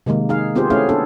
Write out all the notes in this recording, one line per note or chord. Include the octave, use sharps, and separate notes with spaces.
C3 D#3 G#3 A#3
D#4 G#4 F5
B3 C4 F4 G4 G#4 C5
A3 C#4 E4 G#4 F5
B3 D4 G#4 A4